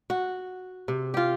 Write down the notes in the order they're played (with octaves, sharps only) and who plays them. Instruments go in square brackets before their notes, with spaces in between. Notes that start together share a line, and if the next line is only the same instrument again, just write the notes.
[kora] F#4
C3
F4 G4